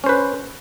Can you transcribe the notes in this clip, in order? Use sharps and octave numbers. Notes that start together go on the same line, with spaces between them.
C#4 B4 C5